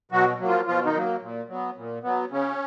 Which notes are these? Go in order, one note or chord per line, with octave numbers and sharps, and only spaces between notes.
B2 F#3 F#4
F#3 A#3
F3 F4
B2 F3 F4
D#3 D#4
F#3 A#3
A#2
F#3 B3
A#2
F#3 B3
C#3 C#4